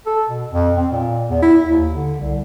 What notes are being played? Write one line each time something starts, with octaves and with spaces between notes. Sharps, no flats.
A4
B2
F2
C4
A#2
E2
E4
D#2
D3
C2